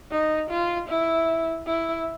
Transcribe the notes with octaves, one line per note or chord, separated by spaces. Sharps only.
D#4
F4
E4
E4